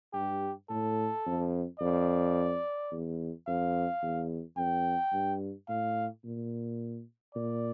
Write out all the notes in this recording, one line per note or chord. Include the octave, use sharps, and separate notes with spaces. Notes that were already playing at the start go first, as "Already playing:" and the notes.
G2 G4
A2 A4
F2
F2 D5
E2
F2 F5
E2
F2 G5
G2
A2 F5
A#2
A#2 D5